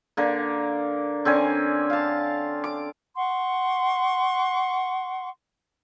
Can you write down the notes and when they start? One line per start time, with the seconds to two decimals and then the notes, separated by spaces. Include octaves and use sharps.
0.17 D3 A#3
1.25 D3 C4 C#4 G#5
1.90 F5 A5
2.64 D6
3.16 F#5 C6 C#6